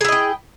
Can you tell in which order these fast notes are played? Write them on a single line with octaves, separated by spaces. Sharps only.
G#4 E4 D#5 G5